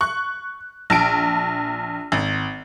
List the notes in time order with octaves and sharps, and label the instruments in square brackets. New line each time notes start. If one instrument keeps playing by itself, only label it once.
[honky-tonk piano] C#6 F#6
A#1 A5 D7
G#1